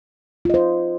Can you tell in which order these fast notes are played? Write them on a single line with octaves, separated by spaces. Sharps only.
F4 D#5 C5